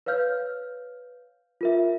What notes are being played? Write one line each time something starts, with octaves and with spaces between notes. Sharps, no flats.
B4 C#5 F5 F6 G6
F4 A#4 E5